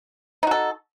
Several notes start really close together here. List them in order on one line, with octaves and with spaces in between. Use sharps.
D#4 F#4 A4